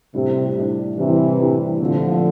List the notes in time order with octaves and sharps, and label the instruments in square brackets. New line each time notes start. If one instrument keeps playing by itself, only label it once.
[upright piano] A2 G3 D4 [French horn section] C3
[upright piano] A2 G3 D4
[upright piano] A2 G3 D4 [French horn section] C3 E3
[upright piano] A2 G3 D4
[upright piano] A#2 A3 C4 [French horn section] D3 F3